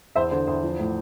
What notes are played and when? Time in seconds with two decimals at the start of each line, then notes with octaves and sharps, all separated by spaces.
0.15 E2 C5 E5
0.31 D3 C5
0.47 E2 C5
0.63 F3
0.79 A2